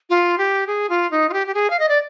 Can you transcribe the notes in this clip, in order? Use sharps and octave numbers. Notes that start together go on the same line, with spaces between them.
F4
G4
G#4
F4
D#4
F4
G4
G4
G#4
F5
D#5
D5